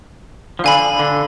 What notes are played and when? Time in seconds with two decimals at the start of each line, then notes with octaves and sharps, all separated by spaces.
0.59 F3
0.64 D3 F5 G#5 B5
0.99 D3